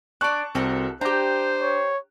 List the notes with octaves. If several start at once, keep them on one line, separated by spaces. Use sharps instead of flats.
D4 D5 A5 C#6 F#6
C2 C4 F#4 A4 A#4
D4 G4 C5 A#5 D6
C#5